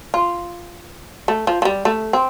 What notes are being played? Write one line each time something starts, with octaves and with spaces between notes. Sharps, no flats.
F4
A3
F3
F3
G3
A3
C4